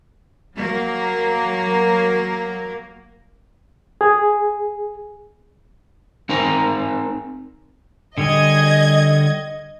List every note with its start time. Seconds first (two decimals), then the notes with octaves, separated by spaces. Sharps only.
0.58 F#3 A#3
4.01 G#4
6.29 C4 D#4 A#4 C5 G#5 A#5
8.18 D3 G3 G#4 D#5 G#6